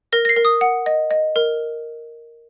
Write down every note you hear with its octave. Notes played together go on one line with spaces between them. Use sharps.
A#4 A#6
A#6
C7
A#4
D#6
F#5
D#5
D#5
A#4